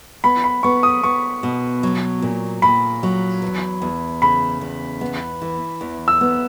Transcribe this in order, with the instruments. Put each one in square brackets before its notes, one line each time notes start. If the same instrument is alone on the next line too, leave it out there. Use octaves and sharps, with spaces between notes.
[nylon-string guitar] B3 [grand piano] B5
[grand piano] B5
[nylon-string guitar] B3 [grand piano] C#6
[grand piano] D#6
[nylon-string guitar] B3 [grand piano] C#6
[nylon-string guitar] B2
F#3
A#2
[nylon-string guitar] A#2 [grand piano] B5
[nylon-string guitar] F#3
E2
E2
[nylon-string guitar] C#3 [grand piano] B5
[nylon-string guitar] E2
B3
E3
E2
[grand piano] E6
[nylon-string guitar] B3